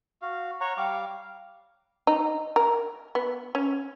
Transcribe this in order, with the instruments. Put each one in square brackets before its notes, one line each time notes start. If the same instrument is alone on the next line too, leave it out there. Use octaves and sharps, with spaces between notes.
[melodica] F#4 F5
C#5 F#5 A#5 C#6
G3 F5 D6
[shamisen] D#4
A#4
B3
C#4